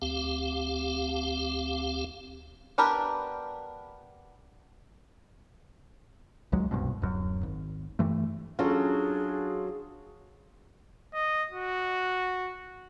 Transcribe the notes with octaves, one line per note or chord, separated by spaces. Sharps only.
D2 C4 G4 F5
B3 D4 G4 A#4 B4
G#1 C#2 F#3 G#3
D1 C2 G2 B2
D1 F#2
G#1
G2 E3 A3
F#3 C#4 D4 F4 F#4 G#4 A4
D#5
F#4